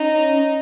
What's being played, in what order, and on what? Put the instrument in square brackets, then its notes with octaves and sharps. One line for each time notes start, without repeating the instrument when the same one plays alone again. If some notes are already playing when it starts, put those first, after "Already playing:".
Already playing: [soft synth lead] C#4 [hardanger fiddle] D#4